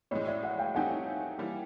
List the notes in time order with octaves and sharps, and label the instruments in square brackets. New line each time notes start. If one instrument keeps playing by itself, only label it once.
[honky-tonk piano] A2 E3 G#3 [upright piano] C#5 D#5
[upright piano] D5 E5
E5 F#5
F5 G5
[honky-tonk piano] E3 A3 C4 D#4 G4 [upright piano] F#5 G#5
[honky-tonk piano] E3 G3 A#3